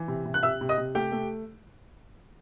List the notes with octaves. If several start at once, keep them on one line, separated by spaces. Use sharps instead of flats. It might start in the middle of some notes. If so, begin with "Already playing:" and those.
Already playing: E3
C3
C3
F#6
C3 E5 E6
C3
D#5 D#6
C3
A3 G4 G5
A3